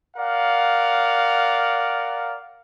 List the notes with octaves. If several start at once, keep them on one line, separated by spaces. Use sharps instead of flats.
A#4 D5 F5 F#5